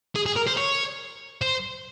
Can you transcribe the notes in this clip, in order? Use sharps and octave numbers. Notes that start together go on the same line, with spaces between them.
G#4
G#4
A#4
C5
C#5
C5